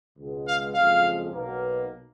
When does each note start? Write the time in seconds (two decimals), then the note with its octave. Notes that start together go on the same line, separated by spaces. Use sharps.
0.17 C#2 B2 G#3
0.46 F5
0.74 F#1 F2 F3 G#3 F5
1.30 B1 B2 A#3